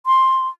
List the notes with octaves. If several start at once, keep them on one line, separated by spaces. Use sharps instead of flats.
C6